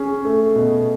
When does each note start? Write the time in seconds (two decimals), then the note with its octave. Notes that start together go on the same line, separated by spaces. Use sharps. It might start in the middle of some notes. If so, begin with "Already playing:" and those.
Already playing: C#4 G#4
0.25 A3
0.55 B2